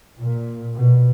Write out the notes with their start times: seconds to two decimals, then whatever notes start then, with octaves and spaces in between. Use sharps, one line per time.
0.20 A#2
0.76 B2